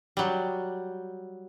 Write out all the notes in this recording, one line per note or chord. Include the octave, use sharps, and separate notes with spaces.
F#3 G3